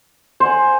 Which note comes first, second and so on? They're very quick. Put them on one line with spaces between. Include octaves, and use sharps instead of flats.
C5 F#5 G#5